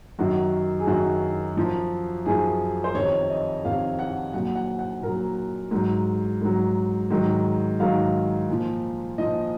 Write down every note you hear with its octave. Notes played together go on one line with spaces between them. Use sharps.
F#2 D#3 F#3 F#4
G#4
F#2 D#3 F#3 F#4
F#2 F3
F#2 F3 G#4
C5
F2 C3 D#3 C#5
D#5
F2 C3 D#3 F5
F#5
A#2 F#3 F#5
F#5
F#5
A#2 F#3 A#4
G#2 F#3
G#2 F#3
G#2 D#3 F#3
G#2 D#3 F#3 F5
A#2 F3
A#2 F3 D#5